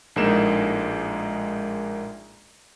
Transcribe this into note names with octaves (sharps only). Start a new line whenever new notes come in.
A#1 A2 G#3 A#3 D#4 E7